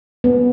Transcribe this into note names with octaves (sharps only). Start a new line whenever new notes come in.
B3